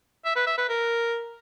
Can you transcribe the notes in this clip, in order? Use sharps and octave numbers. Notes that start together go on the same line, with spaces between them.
E5
B4
E5
B4
A#4